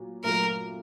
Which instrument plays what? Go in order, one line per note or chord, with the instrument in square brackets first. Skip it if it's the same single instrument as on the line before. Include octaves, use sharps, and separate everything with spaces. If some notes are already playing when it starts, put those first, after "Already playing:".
Already playing: [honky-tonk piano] A#2 F#3
[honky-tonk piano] A#2 F#3 A3 [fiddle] A#4